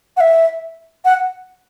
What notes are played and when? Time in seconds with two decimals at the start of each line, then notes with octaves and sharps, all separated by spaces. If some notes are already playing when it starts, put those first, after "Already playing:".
0.17 F#5
0.20 E5
1.05 F#5